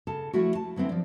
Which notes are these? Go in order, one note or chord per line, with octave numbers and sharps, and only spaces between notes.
C#3 A4 A5
F3 A3 E4 F#4
A5
D3 F#3 B3 C4 E4
F3 D5